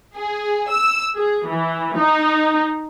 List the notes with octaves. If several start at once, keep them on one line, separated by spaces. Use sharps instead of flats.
G#4
E6
G#4
E3
D#4